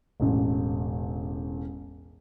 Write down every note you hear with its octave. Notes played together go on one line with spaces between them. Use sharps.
E1 A1